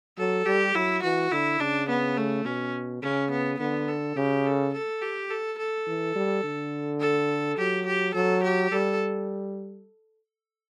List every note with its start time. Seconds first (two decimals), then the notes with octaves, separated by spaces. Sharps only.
0.18 F#3 A4
0.46 G3 G4
0.75 F#3 E4
1.03 E3 F#4
1.32 D3 E4
1.60 C#3 D4
1.89 B3
2.17 A3
2.45 B2 C#4
3.02 C#3 C#4
3.31 B3
3.60 D3 B3
3.88 A4
4.16 C#3 G4
4.45 A4
4.74 A4
5.02 G4
5.30 A4
5.58 A4
5.87 E3
6.16 G3
6.44 D3
7.00 A4
7.58 F#3 G4
7.86 G4
8.14 F#3 A4
8.43 G4
8.71 G3 A4